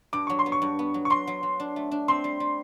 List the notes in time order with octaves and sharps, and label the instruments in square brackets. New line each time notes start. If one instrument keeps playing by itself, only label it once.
[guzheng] G2 [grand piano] D6
[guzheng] F#3 [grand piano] C#6
[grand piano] C6
[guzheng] B3
[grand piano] C#6
[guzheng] G2
B3
F#3
[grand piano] C#6
[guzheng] F#3 [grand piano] C6
[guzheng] F#3
F#3
D4
A3
D4
[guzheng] C4 [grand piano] C6
[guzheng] G3
G3